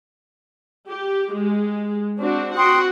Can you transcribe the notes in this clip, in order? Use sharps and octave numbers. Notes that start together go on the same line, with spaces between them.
G4
G#3
C4 D4 F#4
F#4 F#5 G5 C6 D#6